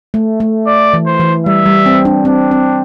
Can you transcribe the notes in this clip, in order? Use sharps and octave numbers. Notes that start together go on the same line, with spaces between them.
A3
A3
D5
E3
C5
E3
G3 E5
G3
C4
D4
C4 D4
C4